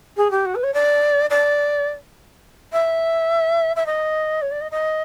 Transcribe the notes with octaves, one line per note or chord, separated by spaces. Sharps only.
G#4
G4
F#4
B4
C#5
D5
D5
E5
E5
D#5
C#5
D5
D#5
D#5